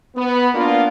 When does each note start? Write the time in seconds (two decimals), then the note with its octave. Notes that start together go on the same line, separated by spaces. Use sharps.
0.16 B3
0.55 A#3 B3 D4 F4